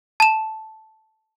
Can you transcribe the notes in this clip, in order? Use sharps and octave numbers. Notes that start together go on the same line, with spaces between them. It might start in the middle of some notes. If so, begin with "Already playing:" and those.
A5 E7